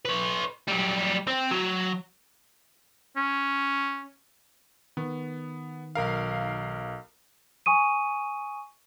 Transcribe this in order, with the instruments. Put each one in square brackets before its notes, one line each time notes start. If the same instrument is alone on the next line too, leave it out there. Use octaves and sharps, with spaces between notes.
[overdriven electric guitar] B4 C#5
F#3 G3
C4
F#3
[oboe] C#4
[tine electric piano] D#3 [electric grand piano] B3
[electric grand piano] B1 A#4 F5
[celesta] G#5 C#6 D#6 D#7